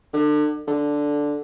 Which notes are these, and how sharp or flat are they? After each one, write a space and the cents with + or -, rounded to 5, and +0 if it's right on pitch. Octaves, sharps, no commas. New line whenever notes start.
D3 +30
D3 -5